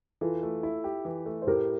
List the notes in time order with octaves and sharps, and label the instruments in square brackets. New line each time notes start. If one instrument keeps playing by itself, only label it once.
[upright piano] E3 [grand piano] F4 A4
[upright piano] A3
E4
G4
E3
A3
[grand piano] C5
[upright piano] A2 [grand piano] G4 A#4